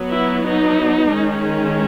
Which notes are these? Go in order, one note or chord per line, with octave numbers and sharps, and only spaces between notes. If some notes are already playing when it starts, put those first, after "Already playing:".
Already playing: F#3 B3
E4
D#4
D#3 G#3 C#4